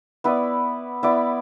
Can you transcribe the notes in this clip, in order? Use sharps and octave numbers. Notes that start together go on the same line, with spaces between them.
B3 E4 B4 D5
B3 E4 B4 D5